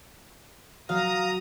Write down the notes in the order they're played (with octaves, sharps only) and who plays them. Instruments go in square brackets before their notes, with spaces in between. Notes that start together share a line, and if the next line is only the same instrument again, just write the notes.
[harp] F#3 [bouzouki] F5 [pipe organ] A#5 D#6